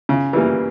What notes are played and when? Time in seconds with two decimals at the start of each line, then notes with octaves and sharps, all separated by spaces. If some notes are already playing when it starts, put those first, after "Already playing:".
0.09 C#3
0.33 E3 G3 A#3